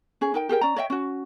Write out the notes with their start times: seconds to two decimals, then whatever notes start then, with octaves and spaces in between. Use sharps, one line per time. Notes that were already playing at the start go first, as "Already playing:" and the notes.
0.21 C#4 G#4
0.34 D#4 A#4 G5
0.49 G4 G#4 A#4 G5
0.61 C#4 D5 A#5
0.76 C#5 D#5 E5 G5
0.90 C#4 F#4